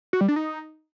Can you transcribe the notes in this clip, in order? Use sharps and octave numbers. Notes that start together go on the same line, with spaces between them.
F#4
G3
D4
D#4